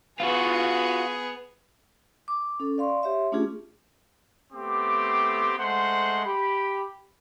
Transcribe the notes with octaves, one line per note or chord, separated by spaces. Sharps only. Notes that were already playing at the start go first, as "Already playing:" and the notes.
B3 F4 F#4 G#4
D6
C#4 A4
D5 F5 C6 C#6
G4 C#5 E5 C6
A3 C#4 D4 F4 G4 G#4
A3 B3 C4 G4 C6 D6
G#3 A3 C5 F#5 C6
G4 B5